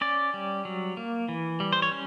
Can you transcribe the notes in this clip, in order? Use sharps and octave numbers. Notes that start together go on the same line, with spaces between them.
C#4 D5
G3
F#3
A#3
E3
G3
C5
C#5
C#4